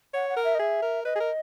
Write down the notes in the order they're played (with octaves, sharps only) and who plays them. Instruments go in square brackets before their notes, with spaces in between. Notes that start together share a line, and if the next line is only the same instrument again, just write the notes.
[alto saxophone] C#5 [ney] F#5
[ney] F#5
[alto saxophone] A#4
[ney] E5
D#5
[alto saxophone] G#4 [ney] E5
[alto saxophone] A#4
[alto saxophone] B4 [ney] D#5
[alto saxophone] G#4
A#4